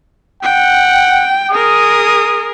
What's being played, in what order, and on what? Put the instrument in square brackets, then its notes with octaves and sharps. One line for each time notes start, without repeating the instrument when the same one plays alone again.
[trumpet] F#5 [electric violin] G5
[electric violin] G#4 A#4 [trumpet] D#6